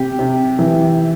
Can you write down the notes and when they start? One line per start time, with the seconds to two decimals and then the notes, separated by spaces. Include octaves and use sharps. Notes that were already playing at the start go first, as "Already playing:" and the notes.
Already playing: C3 G4
0.19 C3
0.59 E3